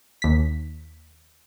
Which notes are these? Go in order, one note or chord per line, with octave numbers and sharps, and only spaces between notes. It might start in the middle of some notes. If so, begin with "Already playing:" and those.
D#2 B6